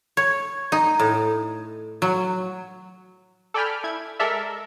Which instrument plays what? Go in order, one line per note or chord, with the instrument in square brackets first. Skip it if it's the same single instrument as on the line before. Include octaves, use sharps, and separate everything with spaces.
[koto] C#5
D#4
A2
F#3
[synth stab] A4 D5 G5 G#5 B5 F6
E4 G#6
G#3 A4 A#4 D5 E5